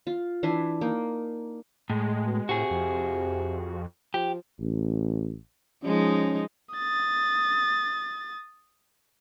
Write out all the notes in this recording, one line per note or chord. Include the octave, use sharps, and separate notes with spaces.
F4
E3 D4 E5 C6
A#3 D#4
A2 G#3
B2
A2 C3 F#4 G#4
F2
F3 G4
A1
F3 G#3 C#4 D#4
D#6 A6